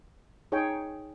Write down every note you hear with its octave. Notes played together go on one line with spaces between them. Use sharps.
D#4 G#4 C#5 G5